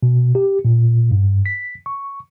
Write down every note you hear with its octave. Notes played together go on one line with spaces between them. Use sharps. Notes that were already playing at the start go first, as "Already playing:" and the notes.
B2
G4
A#2
G2
B6
C#6